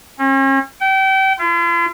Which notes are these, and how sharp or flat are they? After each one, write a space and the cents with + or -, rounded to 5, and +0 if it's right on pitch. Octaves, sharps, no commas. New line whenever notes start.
C#4 -40
G5 -30
F4 -45